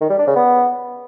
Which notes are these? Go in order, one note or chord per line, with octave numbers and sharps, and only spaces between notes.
D#3
G3
D4
C#3
B3